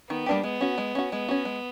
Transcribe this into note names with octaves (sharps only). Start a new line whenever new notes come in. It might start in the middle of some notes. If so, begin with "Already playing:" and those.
D#3 B3
G3 A#3 D4 G4
G#3 B3
C#4 F#4
G#3
C#4 F#4
G#3 B3
C#4 F#4
G#3